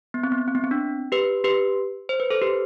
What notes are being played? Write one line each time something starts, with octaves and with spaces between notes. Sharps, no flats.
B3
C4
B3
C4
B3
C4
D4
G4 B4
G4 B4
C5
B4
A4 C5
G4 B4